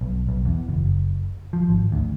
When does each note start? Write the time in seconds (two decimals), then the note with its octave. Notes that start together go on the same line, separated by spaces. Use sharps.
0.01 B1
0.29 B1
0.45 E2
0.69 F#1
1.53 F3
1.69 G#1
1.92 D2